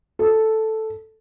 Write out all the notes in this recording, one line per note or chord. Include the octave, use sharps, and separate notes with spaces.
A4